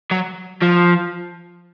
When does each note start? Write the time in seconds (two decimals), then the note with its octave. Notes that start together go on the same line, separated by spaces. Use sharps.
0.11 F#3
0.62 F3